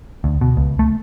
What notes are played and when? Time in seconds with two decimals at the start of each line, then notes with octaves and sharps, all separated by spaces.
0.24 D2
0.41 B2
0.57 C#2
0.79 A3